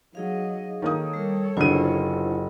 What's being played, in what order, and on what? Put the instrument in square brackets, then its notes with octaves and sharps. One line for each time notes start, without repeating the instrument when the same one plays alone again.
[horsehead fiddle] F#3 D#5 [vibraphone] D#4 G#4 F5
[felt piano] D#3 A#3 D#6 [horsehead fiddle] A4 C#5
[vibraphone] G3 A#4
[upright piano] F#1 D#7 [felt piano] D3 [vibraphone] E4 F4 C5